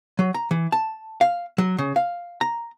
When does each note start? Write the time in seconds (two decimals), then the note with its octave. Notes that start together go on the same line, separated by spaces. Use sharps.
0.19 F#3
0.34 A#5
0.51 E3
0.72 A5
1.21 F5
1.58 F#3
1.78 C#3
1.96 F5
2.41 A#5